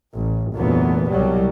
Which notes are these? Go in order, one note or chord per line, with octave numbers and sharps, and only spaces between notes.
A1
F1 D2 A#2 E3 F#3 B3
C2 B2 F#3 G3